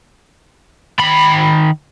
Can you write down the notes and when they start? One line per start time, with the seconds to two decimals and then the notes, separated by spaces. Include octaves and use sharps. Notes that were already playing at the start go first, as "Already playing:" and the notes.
0.99 D#3 B5